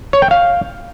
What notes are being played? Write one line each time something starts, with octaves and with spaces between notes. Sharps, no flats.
C#5
G5
F5